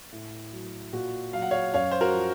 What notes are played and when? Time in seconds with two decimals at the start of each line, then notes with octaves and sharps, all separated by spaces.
0.12 A2
0.52 F#3
0.93 A#2 F#4
1.33 F#3 F5
1.42 F#5
1.51 C#5 F5
1.74 F#2 C#5 F5
1.91 C5
2.01 F#4 A#4
2.14 F3